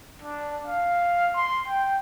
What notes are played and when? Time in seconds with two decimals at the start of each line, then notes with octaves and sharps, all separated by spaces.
0.22 D4
0.67 F5
1.35 C6
1.68 G5